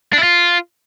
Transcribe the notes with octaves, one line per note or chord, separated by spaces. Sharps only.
D4
E4
F4